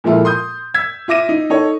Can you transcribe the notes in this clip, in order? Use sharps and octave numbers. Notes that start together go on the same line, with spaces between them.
A#2 F3 G#3 E4 F4 A4
C6 D#6 G6
E6 G#6 B6
F4 E5 D6 A#6 D#7
D#4
D#4 A4 C#5